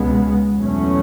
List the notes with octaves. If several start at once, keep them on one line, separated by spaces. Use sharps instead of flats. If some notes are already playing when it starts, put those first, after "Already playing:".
Already playing: C#2 B2 G#3 B3
E2 B2 F#3 A3 C#4